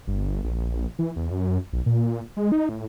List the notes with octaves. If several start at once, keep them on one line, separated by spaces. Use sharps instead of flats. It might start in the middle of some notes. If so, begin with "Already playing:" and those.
G1
A#1
E3
E2
F#2
B1
A#2
G#3
D#4
A2